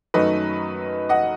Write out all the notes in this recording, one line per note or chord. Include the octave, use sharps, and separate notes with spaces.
F#2 D#3 F#3 A3 D#4 B4 D#5
D#5 F#5